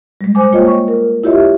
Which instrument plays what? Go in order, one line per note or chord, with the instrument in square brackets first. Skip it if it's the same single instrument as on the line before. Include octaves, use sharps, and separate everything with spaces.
[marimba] G3 G#3
C5 G#5 D6
A#3 F4 C5 C#5 D#5 G5
C#6
A#4
E4 F4 G4 C#5 D#5 E5